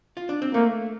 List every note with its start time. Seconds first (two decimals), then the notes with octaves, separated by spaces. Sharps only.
0.17 F4
0.29 D4
0.42 C4
0.54 A3 A#3